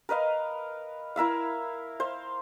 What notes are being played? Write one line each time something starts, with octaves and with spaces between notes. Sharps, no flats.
A#4 B4 D#5 F5
E4 A#4 E5 F5
C5 F5